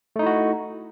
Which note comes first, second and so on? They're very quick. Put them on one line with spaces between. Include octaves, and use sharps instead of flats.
A3 D#4 E4 F#4